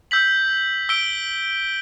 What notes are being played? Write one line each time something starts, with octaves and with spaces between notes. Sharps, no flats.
E6 G6 B6 F#7
E6 B6 D7 G7